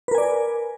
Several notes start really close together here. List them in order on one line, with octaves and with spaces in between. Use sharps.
B4 A#4 G#5 D5